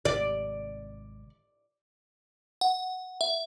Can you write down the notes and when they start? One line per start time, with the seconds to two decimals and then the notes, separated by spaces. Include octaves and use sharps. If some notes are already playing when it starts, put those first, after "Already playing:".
0.05 G#1 C3 D5
2.61 F#5
3.21 E5